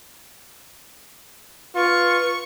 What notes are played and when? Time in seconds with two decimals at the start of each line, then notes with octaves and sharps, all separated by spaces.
1.75 F4 B4 C#6